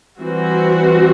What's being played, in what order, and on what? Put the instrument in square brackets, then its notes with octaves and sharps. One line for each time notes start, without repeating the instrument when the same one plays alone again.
[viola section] E3 G3 C4 F#4